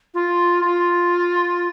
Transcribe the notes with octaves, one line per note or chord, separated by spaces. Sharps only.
F4
F4